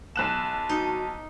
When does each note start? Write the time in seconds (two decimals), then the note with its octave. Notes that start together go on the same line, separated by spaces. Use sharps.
0.16 B1 A5 F#6 E7
0.69 D#4 F#4